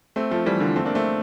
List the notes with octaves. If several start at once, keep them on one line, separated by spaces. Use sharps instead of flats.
A3 C4
F3 A3
E3 G3
D3 F3
A3 C4
A#3 D4
A3 C4